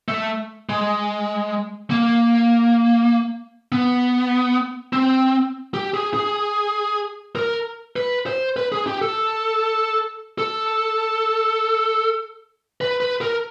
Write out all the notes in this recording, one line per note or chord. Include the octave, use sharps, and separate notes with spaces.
A3
G#3
A#3
B3
C4
G4
G#4
G#4
A#4
B4
C5
B4
G#4
G4
A4
A4
B4
B4
A#4